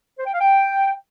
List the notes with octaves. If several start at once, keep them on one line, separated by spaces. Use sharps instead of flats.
C5
G5
F5
G5